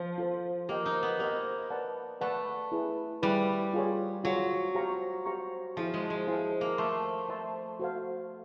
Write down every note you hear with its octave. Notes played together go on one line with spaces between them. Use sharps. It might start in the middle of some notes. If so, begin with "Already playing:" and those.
Already playing: F3
F4 A4 C5
A#3 G4 C5 D#5 G5
D#4
B3
A#3 G4 C5 D#5 G5
B4 D5 F#5 A5
A3 B4 D5 F#5 A5
E4 G#4 B4
G3 E4 G#4 B4
F4 G#4 C#5
F#3 F4 G#4 C#5
G4 C5 F5 A#5 C#6
G4 C5 F5 A#5 C#6
F3 E4 G#4 C5 F5 A5
G#3
G#3
E4 G#4 C5 F5 A5
A#3
A3 C5 E5 A5 C6
C5 E5 A5 C6
F#4 A4 C5 F5